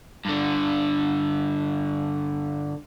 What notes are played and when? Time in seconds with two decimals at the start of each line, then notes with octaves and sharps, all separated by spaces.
0.25 G2 D3